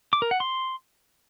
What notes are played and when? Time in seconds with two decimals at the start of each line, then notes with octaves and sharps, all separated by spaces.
0.13 D6
0.22 A#4
0.31 F#5
0.40 C6